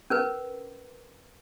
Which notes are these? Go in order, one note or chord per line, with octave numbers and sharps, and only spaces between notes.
C#4 A#4 B4